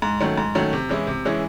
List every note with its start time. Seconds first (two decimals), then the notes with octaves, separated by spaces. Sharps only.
0.02 G#2
0.21 D#3 F#3 A3 C#4
0.38 G#2
0.55 D#3 F#3 A3 C#4
0.73 C3
0.89 E3 G#3 C#4 E4
1.07 C3
1.25 E3 G#3 C#4 E4